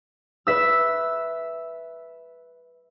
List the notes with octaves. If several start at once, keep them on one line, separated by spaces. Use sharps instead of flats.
B4 E5 E6